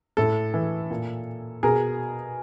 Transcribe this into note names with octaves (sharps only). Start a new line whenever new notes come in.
A2 A4
E3
A#2
B2 G#4 A#4